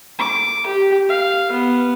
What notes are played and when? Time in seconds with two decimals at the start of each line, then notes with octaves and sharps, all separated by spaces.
0.19 D6
0.67 G4
1.09 F5
1.52 B3